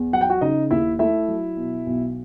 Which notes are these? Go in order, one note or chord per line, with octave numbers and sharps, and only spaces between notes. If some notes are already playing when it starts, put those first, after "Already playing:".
Already playing: E2
F#3 F#5
G5
F#4 F#5
C#3 D#4 D#5
D#2 E4 E5
A3 E4 E5
F#3
B2
B1